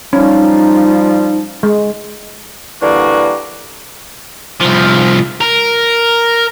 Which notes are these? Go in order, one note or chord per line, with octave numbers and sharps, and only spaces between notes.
F3 G3 C#4 D#4
G#3
D3 E3 G3 A#3 F#4
C2 F3
A#4